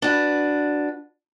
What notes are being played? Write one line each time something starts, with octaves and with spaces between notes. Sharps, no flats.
D4 F#4 B4